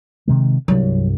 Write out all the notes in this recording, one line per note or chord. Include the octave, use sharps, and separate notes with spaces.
C3 D#3 G#3
C2 G2 F#3